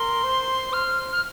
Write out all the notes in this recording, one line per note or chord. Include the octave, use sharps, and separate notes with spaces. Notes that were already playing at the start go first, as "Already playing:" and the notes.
Already playing: A#4 C6
C5
C5 F6
F6